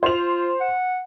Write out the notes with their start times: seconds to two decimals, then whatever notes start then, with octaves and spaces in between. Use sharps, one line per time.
0.03 F4 C5 F7
0.60 F#5